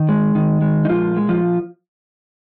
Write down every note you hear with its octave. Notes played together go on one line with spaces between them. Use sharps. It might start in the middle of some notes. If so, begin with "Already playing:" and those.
Already playing: D#3
G#3
D#3
G#3
D#4
A#2 F3 F4
G#3
F3 F4